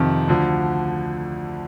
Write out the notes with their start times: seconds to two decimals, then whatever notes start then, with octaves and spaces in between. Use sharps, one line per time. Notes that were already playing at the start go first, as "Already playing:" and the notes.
Already playing: F2 C3 D#3
0.28 D2 D3 F3